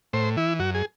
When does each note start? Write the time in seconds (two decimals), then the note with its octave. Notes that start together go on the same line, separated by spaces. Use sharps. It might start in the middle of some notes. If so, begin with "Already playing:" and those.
0.13 A2 C5
0.37 E3 E4
0.59 F#2 F#4
0.75 G#4